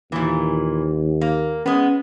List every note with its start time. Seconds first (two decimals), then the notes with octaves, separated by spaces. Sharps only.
0.12 D#2 A#2 E3
1.21 A#3
1.66 G#3 B3 C#4